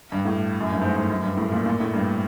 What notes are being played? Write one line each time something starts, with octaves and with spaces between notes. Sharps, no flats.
G2
A2
F#2
G2
G#2
G#2
F#2
G2
A2
A#2
A#2
A2
G2